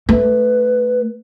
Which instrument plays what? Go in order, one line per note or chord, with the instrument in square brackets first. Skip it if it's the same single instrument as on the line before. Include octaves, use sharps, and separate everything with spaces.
[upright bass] A3 [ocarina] B4